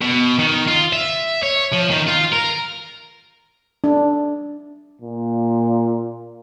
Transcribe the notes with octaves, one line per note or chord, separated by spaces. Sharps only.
B2
D#3
F4
E5
C#5
F3
D#3
F4
A#4
D4
A#2